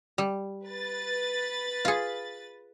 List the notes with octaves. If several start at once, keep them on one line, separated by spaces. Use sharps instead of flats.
G3
B4 A6
F4 G#4